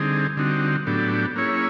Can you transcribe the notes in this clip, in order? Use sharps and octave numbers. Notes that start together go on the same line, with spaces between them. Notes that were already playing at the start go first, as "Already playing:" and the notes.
Already playing: D3 G3 C4 D#4 G#4
D3 G3 C4 D#4 F#4
A2 F#3 B3 D4 G4
A#3 C#4 E4 G#4 C#5